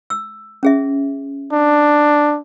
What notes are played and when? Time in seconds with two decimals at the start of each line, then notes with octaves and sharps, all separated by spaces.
0.10 E6
0.63 C#4 G#4 E5
1.52 D4